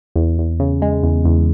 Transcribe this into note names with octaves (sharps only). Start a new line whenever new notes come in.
E2
E2
C#3
G#3
E2
E2